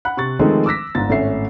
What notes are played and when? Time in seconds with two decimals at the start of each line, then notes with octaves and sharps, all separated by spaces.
0.05 F#5 B5 F#6
0.17 C3 C#6 A6
0.39 D#3 F3 G#3 A3 C4 D#4
0.66 D6 E6 F#6 A#6 B6
0.95 G1 G#2 A6
1.09 G#1 A2 A3 C#4 E5 C7